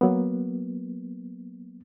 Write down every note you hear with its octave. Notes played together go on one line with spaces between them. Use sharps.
F#3 A#3 B3